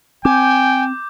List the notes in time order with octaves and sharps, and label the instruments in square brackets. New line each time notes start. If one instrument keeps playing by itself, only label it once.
[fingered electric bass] C4 [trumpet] G5 [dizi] G#5 [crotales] D6 G6